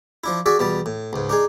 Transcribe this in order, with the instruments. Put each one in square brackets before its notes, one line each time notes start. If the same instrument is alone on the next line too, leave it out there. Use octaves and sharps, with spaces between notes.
[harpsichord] F3 D4 E4
F#4 G#4 D5 E5
E2 B2 G3 A5
A2
C#2 G#2
D4 D#4 G#4